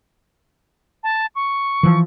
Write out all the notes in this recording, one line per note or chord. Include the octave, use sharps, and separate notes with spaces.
A5
C#6
E3 F3